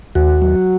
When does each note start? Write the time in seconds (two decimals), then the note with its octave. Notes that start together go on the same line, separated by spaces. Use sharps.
0.15 D#2 F#4
0.42 F#3